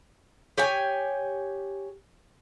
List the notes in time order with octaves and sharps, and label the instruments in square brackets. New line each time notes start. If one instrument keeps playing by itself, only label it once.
[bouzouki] G4 C#5 G5 G#5